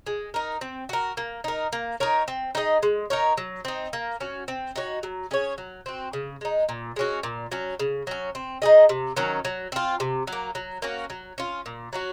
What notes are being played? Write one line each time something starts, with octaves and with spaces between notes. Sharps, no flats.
G#3
D#4 A#4
C4
F#4 A#4
A#3
D#4 A#4
A#3
D#4 A#4 C#5
C4
D#4 G#4 D#5
G#3
D#4 A#4 C#5
F#3
C4 D#4
A#3
C#4 F#4
C4
D#4 F#4 C#5
F#3
C#4 G#4 C#5
F#3
C4 F#4
C#3
G#3 D#4
A#2
G#3 C#4 F#4
A#2
F#3 C#4
C#3
F#3 C#4
C4
D#4 G#4 D#5
C3
D#3 F#3 C#4
F#3
C4 F4
C3
F#3
A#3
F#3
A#3 C#4 F#4
F#3
C#4 F4
A#2
F#3 C#4 F#4